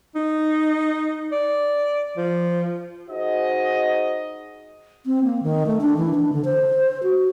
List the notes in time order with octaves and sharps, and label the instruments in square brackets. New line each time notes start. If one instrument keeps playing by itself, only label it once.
[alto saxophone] D#4
D5
F3
[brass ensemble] D#4 F#4 G#4 C5 D#5
[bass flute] C4
A#3
D#3
A3
D4
E3
D4
D3
C5
F#4